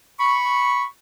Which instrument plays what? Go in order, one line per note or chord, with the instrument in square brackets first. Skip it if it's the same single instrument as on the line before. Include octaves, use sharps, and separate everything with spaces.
[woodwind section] B5 C#6